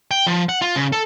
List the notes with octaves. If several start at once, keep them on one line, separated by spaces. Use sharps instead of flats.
G5
F3
F#5
F4
C#3
A4